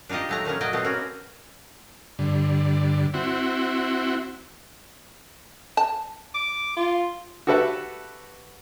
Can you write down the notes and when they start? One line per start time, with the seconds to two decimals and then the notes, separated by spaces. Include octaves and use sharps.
0.09 D4 D#4 F4 G4 D#5
0.29 F#3 A3 A#5
0.45 A#2 F3 A3 C#4
0.61 F#3 D#5 G5
0.73 B2 A3 B3 C4
0.84 A#3 C#4 F#4
2.19 G2 D3
3.14 C4 E4 F#4
5.77 A5
6.35 D6
6.77 F4
7.47 F#4 G4 A4 B4 E5 F#5